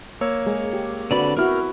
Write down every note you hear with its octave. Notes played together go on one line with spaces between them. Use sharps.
A#3 C#5 E6
G#3 G#4
G4
D3 C4 F#4 B4 D5 B5
B3 E4 F#4 A#4 F6